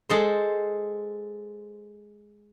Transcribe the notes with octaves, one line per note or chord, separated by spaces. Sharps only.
G#3 A4 C5